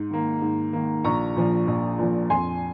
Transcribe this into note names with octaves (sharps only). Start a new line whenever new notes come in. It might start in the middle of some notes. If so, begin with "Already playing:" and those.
Already playing: G#2
D#3 A#3
G#2
D#3 A#3
A#1 A#5 C#6
A#2 F3
A#1
A#2 F3
F2 G#5 C6